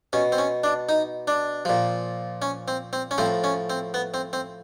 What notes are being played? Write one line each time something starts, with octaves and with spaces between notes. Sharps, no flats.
B2 C#4
C4
C#4
D4
D#4
D4
A#2 F3
C#4
C4
C4
C#4
A2 F3 C4
C#4
C4
B3
C4
C4